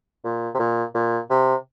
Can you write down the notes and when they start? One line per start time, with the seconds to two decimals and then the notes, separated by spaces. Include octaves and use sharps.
0.25 A#2
0.54 C3
0.59 A#2
0.94 A#2
1.30 C3